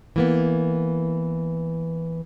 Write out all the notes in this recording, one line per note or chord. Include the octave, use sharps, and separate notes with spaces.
E3 A#3 B3